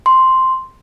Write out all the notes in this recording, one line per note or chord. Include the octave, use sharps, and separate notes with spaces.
C6